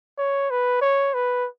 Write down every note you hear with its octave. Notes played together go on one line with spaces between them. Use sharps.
C#5
B4
C#5
B4